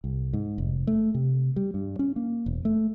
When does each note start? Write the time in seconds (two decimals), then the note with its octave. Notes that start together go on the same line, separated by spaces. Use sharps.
0.04 C2
0.33 G#2
0.58 F1
0.87 A3
1.14 C3
1.56 G3
1.74 G2
1.99 C#4
2.16 A#3
2.46 E1
2.65 A3